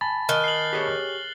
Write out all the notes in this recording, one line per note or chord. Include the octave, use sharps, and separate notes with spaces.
G#5 A5 B5 A6
D#3 F6 F#6 G7
C7 F#7
G4 G#4 C#5